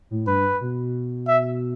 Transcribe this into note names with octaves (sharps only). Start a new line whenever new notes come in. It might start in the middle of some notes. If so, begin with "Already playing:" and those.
A2
G2 B4
B2
E5